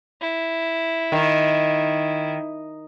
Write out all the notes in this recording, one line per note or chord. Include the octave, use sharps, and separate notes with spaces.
E4
D#3